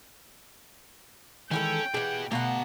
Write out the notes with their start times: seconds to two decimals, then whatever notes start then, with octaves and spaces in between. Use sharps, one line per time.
1.51 D#3 E3 G#3 C#4 E4 F#4 A4 G5
1.94 B2 E3 G4 G#4 F#5
2.31 B2 A3 B3 G4 F5 F#5 A#5